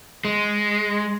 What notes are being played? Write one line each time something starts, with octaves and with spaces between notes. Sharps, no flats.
G#3